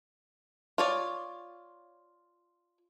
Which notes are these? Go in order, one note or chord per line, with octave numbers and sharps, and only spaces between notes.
F4 C#5 D5